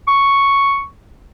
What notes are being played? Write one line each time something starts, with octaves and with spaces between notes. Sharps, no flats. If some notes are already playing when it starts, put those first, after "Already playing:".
C#6